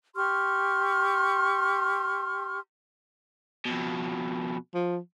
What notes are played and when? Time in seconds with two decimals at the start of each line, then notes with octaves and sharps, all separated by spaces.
0.16 G4 C6 C#6 F6
3.66 F2 B2
4.74 F3